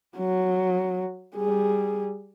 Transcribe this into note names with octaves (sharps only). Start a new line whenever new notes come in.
F#3
G3 G#4